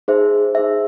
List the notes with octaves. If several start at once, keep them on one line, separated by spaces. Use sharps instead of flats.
D#4 G#4 C5 E5
D#4 G#4 C5 E5